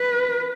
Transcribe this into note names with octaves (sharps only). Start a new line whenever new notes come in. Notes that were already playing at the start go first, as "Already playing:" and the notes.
Already playing: B4